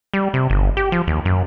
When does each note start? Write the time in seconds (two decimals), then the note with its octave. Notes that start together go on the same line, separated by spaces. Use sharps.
0.14 G3
0.34 C3
0.50 G1
0.77 G4
0.92 F3
1.08 D#2
1.25 F#2